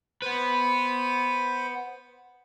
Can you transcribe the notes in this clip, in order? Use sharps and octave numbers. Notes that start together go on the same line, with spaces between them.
B3 B4 C5 B5